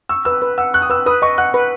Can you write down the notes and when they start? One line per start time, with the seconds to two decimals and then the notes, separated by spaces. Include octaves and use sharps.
0.09 C#6 E6
0.25 B4 E6
0.42 B4
0.58 F#5 E6
0.74 C#6 F#6
0.82 D#6
0.90 B4 E6
1.06 B4 D#6
1.22 D#5 C#6
1.38 F#5 F#6
1.54 B4